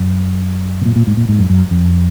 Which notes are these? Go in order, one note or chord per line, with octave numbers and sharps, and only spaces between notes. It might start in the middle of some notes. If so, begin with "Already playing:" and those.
Already playing: F#2
B2
A#2
A#2
G#2
A#2
G#2
F#2
F#2
F2